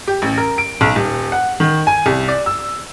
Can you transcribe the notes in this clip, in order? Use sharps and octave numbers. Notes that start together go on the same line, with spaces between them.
G4
A1
A#4
D7
B1
D#1
F#5
D#3
G#5
C2
D5
E6